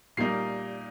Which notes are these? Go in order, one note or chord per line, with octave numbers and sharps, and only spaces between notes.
A#2 G3 A#3 D#4 C7